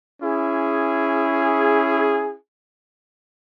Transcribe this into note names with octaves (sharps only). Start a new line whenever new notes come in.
C#4 E4 G#4